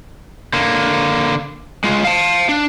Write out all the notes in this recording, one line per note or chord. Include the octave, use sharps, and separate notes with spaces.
D3 A#3
G#3 F4
F5 A5
D4